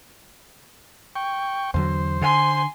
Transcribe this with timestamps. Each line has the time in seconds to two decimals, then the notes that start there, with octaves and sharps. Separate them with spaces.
1.16 G5 C#6
1.74 E2 D3 F#3 C5
2.21 D3 G#5 C6